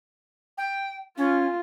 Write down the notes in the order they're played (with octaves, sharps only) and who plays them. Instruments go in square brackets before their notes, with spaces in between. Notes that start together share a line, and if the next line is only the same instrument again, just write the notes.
[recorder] G5
[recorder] C#4 [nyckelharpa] F4